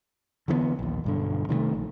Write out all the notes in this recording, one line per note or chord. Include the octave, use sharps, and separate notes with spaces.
D3 E3 G#3 B3
A#1 D#2
B1 G2 D3
C3 D#3 F3 A3
A#1